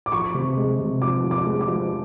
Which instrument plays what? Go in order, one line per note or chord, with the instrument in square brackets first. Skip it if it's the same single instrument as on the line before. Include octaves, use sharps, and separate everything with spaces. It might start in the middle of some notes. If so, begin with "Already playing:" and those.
[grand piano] D6
F3 C#6
C3
G#3
C3
F3 D6
F3
D6
G#3
D6
F3